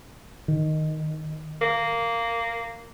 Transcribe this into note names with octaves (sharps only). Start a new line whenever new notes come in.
D#3
A#3